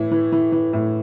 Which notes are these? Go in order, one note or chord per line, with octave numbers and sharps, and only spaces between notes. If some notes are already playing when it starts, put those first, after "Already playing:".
Already playing: A2 E3 E4
E3
E3
E3
A2